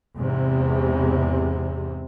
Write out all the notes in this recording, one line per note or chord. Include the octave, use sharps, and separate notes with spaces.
E2 G#2 C3